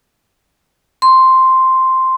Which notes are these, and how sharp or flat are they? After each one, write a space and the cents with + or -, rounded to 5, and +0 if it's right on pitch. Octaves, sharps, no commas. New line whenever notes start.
C6 +0